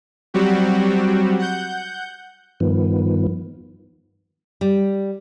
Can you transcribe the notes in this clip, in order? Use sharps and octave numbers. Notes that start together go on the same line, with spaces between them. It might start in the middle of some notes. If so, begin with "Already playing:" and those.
F#3 G3 C4 F#4 G4
F#5 G6
G2 D#3 F3 B3
G3